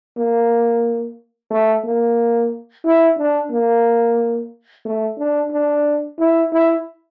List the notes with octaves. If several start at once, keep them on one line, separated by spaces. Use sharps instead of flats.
A#3
A3
A#3
E4
D4
A#3
A3
D4
D4
E4
E4